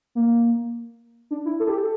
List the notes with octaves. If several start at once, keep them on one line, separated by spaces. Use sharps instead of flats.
A#3
D4
E4
A4
G4
A4